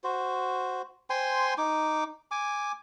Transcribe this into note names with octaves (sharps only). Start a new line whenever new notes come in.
F#4 C5
C5 G5 G#5 C6
D#4 D6
G#5 D6